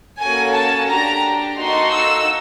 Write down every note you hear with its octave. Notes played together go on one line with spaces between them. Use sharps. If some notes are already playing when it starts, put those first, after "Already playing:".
A#3 C#4 F#4 A4 G#5
A5
D4 G4 A#5
A#3 D#4 F#4 A4 C6
E6